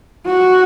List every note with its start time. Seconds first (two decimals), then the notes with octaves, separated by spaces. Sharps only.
0.27 F#4